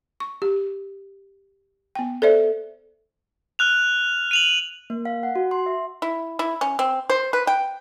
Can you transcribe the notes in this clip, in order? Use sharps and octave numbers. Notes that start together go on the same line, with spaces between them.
C#6
G4
B3 G5
A4 C5 D5 E5
F6 F#6 F7
D#7 F7 F#7
A#3
F5
F#5
F#4
C6
E5
E4
E4
C#4
C4
C5
B4
G5